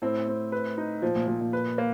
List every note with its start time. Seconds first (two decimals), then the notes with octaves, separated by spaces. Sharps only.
0.02 A2 C4
0.28 C4
0.52 B4
0.78 D#4
1.02 A#2 F3
1.15 A#2
1.27 A#2 F3
1.41 A#2
1.53 B4
1.78 A#3